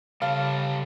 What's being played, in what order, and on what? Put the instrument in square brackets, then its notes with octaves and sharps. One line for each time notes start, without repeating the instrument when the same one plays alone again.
[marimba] C#3 [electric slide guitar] G3 A4 [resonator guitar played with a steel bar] F5